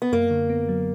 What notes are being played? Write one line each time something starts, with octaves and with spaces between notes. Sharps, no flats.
B3
F#2 A#3
D3
B3
F#3